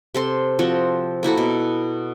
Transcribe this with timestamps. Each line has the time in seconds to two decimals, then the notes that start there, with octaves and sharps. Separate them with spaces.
0.14 C3 A4 C6
0.59 F3 C4 F#4
1.23 A#3 E4 F#4 A4
1.38 B2